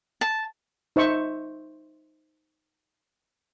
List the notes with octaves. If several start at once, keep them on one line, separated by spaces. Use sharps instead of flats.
A5
D#4 C5 E5 C#6